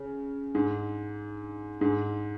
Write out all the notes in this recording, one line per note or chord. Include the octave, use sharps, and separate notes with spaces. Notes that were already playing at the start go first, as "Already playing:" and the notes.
Already playing: C#3
G#2
G#2